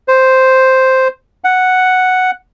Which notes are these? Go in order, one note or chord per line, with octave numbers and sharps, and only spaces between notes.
C5
F#5